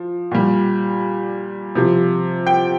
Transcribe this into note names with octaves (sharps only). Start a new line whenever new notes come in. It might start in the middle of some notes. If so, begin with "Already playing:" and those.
Already playing: F3
A#2 G3
C3 F3
G5